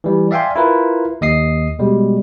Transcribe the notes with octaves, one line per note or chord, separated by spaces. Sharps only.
E3 G3
D5 E5 F5 G5 G#5 C6
E4 F4 A#4 B4
D#2 D#5 D#6 C7
B2 G3 G#3